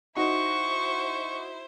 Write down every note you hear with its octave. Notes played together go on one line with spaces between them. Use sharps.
D#4 E4 F#4 C5 C#6